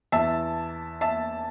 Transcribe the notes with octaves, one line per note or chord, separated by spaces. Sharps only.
E2 E3 E5 A5
E5 A5